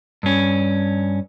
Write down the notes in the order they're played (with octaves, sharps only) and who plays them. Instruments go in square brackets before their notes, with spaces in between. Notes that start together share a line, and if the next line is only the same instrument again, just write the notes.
[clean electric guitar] G2 C#4